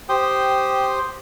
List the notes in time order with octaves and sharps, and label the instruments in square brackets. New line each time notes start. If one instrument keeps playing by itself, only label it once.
[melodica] G4 C5 G5 D#6